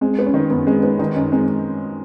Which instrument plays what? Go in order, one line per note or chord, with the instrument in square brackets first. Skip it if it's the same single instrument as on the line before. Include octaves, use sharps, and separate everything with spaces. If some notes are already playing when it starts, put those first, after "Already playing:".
[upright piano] G#3 [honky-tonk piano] C4
[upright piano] B3
[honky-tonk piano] C#4
[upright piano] D#3
[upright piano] F#2 [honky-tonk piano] B3
[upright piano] G#3 [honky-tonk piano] C4
[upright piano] B3 [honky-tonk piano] D#4
[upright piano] D#3 [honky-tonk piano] D#4
[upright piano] F#2 [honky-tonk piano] C#4
[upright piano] G#3 [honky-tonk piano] C4